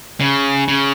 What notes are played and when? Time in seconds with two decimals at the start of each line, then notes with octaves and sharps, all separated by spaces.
0.20 C#3
0.68 C#3